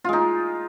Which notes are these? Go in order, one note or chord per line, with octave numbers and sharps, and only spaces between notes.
G#3 D#4 F4